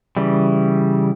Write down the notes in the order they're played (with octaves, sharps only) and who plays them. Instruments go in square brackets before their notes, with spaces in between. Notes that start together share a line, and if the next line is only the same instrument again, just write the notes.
[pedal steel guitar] C#3 E3 G3